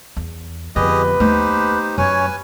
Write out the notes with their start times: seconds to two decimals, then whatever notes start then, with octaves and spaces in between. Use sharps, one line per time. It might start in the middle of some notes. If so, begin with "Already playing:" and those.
0.17 E2
0.76 F2 D3 G3 B3 G4 G#4 B4 D#5
1.20 D#2 A3 D#4 G4 C5
1.98 F#2 C#4 B4 C#5 G#5